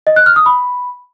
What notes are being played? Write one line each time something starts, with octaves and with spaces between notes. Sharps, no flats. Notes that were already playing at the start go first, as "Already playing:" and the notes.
D#5
F#6
F6
D#6
B5